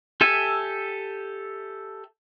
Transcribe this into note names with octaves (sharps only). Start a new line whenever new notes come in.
G4 A4 E5 G#5